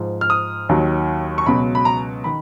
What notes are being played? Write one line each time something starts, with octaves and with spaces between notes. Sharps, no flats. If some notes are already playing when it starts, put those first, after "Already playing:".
Already playing: G#2 F3
F6
D#6
D#2 D#3 F#3
C#6
C#2 B2 F#3 B5
B5
A#5
D#3 B5